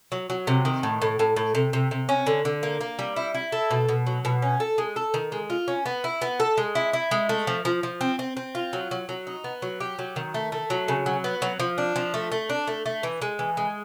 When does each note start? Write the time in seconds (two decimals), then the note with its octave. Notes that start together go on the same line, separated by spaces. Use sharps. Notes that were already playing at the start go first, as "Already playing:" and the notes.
0.12 F#3
0.30 F#3
0.47 C3
0.65 D#3
0.83 A2
1.02 A2
1.19 A2
1.37 A2
1.55 C3
1.73 C3
1.91 C3
2.09 C#4
2.26 D3
2.45 D3
2.63 A#3
2.81 A#3
2.99 G3
3.16 E4
3.34 E4
3.52 A4
3.71 B2
3.89 B2
4.06 F#3
4.25 B2
4.42 C#4
4.60 A4
4.78 G#3
4.96 A4
5.14 D#3
5.32 G#3
5.50 F4
5.68 C#4
5.86 B3
6.04 E4
6.22 B3
6.40 A4
6.58 G#3
6.75 E4
6.93 E4
7.11 G#3
7.29 A3
7.47 F3
7.65 F3
7.83 F3
8.01 C4
8.19 C4
8.37 C4
8.55 F4
8.73 F#3
8.91 F#3
9.09 F#3
9.27 D#4
9.44 B3
9.62 F#3
9.80 G4
9.99 F#3
10.16 D#3
10.34 A3
10.52 A3
10.70 F#3
10.88 C#3
11.06 F#3
11.24 B3
11.42 F#3
11.60 F3
11.78 D4
11.96 F3
12.14 A3
12.32 A3
12.50 D4
12.67 A3
12.86 A3
13.03 E3
13.22 G#3
13.39 E3
13.57 G#3